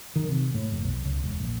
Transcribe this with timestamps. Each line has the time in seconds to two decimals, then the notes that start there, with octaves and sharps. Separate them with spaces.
0.16 D#3
0.28 C3
0.54 A2
0.72 F1
0.84 B1
1.04 C#2
1.23 E1
1.40 A#1